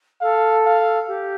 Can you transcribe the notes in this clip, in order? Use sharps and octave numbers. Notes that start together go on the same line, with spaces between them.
A4 F5
F5
G4